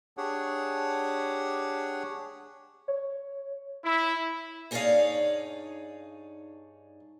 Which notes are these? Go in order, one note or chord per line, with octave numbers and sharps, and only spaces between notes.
D4 G4 G#4 C#5 F#5
C#5
E4
G2 D#4 G#4 C#5 D5 F5